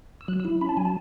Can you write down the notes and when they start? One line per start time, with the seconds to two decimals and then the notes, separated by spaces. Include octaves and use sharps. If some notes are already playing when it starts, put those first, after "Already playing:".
0.21 E6
0.28 F#3 F#6
0.40 E6
0.45 E4
0.61 C#4 B5
0.69 A5
0.77 F#3 G#5
0.85 A5